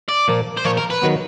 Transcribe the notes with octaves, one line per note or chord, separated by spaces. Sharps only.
D5
A#2 F3 A#3
C5
A#2 F3 A#3 C#5
A#4
B4
D#3 F#3 B3